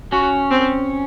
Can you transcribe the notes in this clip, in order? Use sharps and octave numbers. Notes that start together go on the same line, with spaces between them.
C#4 F#4
C4